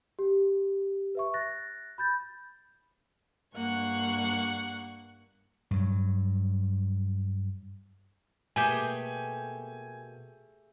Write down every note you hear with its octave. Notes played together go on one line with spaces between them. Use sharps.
G4
B4 E5 C#6
F#6 A6 A#6
B5 G6 A6
G2 A#3 F#5 C#6 F#6
G2 F#3
B2 A3 A#3 G4 G#4 B4 G#5 G6